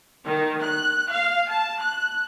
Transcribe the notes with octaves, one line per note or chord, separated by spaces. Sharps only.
D#3
F#6
F5
A5
F#6